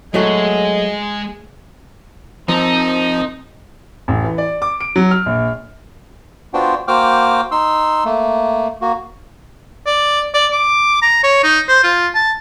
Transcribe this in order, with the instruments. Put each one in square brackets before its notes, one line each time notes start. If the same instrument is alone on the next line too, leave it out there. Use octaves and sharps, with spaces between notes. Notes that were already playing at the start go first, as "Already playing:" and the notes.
[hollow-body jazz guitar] F#3 A3 F#4 [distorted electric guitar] G#3 [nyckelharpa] G#4 [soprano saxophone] D#5
[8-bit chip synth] F3 [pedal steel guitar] C4 A#4 A5 [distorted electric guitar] D#4
[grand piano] A1
E3
D5
D6
D7
F#3
F6
A#1
[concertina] B3 D4 F4 F#4 C5 G5
A#3 F#4 C5 G5 D6 F6
D#4 C6 E6
A3 A#3
A#3 F#4
[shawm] D5
D5
D6
A#5
C#5
D#4
C5
F4
A5